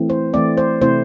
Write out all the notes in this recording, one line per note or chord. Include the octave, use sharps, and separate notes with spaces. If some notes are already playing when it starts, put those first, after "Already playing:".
Already playing: E3 A3 C4
C5
E3 A3 C4 D5
C5
C3 A3 C4 E4 C5